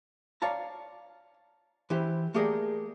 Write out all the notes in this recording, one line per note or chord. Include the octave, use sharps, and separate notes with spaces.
C#5 D5 F5 A5 A#5
E3 E4 G4 C5
A3 A#3 G4 G#4 A#4 D5